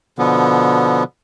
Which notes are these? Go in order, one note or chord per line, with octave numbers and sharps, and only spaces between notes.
B2 D3 F3 B3